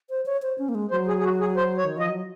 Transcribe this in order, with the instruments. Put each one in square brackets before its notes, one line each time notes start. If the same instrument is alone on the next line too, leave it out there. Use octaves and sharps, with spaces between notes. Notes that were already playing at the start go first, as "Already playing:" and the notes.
[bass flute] C5
C#5
C5
C#4
A#3
G#3
[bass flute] F#3 [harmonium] C5
[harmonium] G#4
G#4
F#4
G#4
C5
C#5
[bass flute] D#3
[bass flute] F3 [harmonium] D#5
[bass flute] F#3